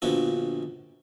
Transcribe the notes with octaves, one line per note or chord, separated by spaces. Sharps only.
A#1 B2 D3 F3 F#4 A4